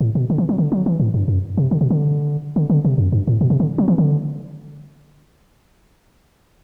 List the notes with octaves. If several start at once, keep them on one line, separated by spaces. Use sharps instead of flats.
A2
B2
D3
E3
F#3
D3
F#3
E3
A2
G2
F#2
C3
D3
B2
D3
D3
D3
C3
F#2
G2
A2
B2
C3
D3
F#3
E3
D3